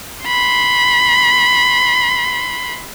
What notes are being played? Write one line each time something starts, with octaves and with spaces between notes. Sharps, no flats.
B5 C6